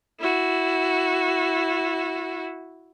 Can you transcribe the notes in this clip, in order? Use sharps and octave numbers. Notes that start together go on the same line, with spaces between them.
E4 F#4